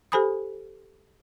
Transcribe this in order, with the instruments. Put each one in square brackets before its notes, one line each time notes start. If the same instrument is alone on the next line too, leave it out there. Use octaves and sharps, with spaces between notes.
[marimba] G4 A4 C5 G#5 B5 D#6